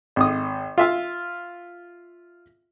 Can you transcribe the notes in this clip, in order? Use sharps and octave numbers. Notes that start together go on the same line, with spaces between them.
G#1 D#6
F4 E5 F5